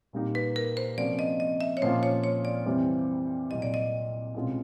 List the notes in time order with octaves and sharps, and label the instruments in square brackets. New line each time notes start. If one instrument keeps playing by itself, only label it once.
[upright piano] A#2 G3 A#3 D#4 G4
[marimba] B4
A#4
C5
[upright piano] C3 F3 A#3 C#4 F#4 [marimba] D5
[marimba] D#5
D#5
E5
C#5
[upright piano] A#2 F3 A#3 C#4 F4 [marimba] C5
[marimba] C#5
C#5
D5
[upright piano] F2 C3 E3 G3 C4
[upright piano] C2 A#2 F#3 [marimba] D#5
[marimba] D5
D#5
[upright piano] C2 B2 G#3 C#4 F4